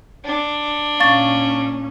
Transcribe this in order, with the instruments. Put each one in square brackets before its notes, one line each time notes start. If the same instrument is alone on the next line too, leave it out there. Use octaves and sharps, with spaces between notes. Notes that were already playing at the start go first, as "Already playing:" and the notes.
[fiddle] D4
[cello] A#2 C#4 [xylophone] F5 C#6 A6